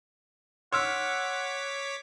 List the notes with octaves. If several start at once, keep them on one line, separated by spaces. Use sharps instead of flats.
C#5 F#5 C6 D6 E6 F6 B6